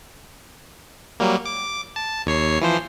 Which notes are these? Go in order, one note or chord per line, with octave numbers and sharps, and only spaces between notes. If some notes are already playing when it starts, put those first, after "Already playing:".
F#3 G3 A#3
D6
A5
D#2 C#5 C7
E3 F3 C5